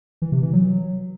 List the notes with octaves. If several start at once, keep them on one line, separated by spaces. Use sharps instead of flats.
E3
C3
E3
F#3